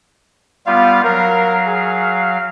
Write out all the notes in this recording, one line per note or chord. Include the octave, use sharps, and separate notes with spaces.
G3 B3 F4 F5
F#3 A#4 F5
G#4